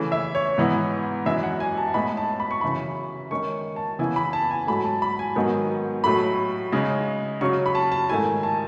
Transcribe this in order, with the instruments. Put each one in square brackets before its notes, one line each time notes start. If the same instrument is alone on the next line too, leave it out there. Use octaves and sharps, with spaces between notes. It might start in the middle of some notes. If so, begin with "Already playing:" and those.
Already playing: [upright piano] C#3 E3 A3
E5
C#5
G#2 E3 B3 E4
F#2 E3 G#3 E5
F#5
G#5
A5
A2 G#3 B3 D#4 B5
A5
B5
C#6
F#2 C#3 E3 B5
D#3 G#3 C#4 C#6
A5
C#3 E3 B3 E4 G#5
B5
A5
G#5
G#2 F#3 A3 B5
A5
B5
G#5
G#2 D#3 F#3 B3 D#4
A2 F#3 A3 B5
C#3 G#3 D#4
C#3 F#3 C#4 C#6
B5
A5
A5
G#2 D#3 A3 E4 G#5
A5